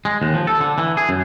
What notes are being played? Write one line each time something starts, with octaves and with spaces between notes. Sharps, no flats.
G#3
D#2
F3
A4
D3
E3
G#4
F#2